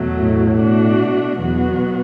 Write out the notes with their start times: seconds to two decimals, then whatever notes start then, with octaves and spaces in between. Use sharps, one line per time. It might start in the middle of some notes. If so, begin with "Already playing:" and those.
Already playing: E2 B2 F#3 A3
0.21 A2
0.59 B2 A3 D4 F#4
1.38 E2 B2 F#3 B3 F#4